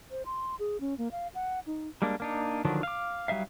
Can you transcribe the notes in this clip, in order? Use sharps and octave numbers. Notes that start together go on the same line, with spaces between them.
C5
C6
G#4
C#4
A#3
F5
F#5
D#4
G3 G#3 A#3 D4
A#3 D4 D#4
D3 D#3 F3 F#3 D4
F5 D6
F#3 G3 D#4 E5 F5